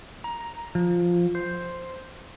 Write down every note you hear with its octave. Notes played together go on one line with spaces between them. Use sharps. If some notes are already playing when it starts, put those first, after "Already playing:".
A#5
F3
C5